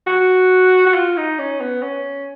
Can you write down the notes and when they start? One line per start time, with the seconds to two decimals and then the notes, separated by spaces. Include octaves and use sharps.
0.07 F#4
0.86 F#4
0.95 F4
1.17 D#4
1.39 C#4
1.61 B3
1.83 C#4